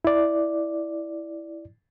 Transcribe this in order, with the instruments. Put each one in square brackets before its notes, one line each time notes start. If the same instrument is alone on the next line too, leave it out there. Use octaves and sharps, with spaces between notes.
[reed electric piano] E4 D5